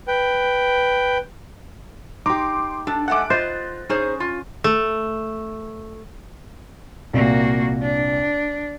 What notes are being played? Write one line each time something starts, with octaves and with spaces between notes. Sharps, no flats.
B4 G5
D#4 G4 C6 D6
D4 A4
G#3 A3 F#5 D6 F#6
F4 C5 D#5 A6
C#4 D#4 G#4 C5
F4
A3
C2 A#2 A#3 F#4
D4